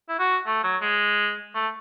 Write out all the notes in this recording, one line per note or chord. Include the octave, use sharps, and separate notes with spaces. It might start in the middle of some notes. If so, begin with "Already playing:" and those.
E4
F#4
A3
F#3
G#3
A3